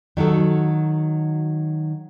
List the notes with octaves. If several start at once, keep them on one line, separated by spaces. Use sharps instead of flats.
D#3 F#3 F#4 A4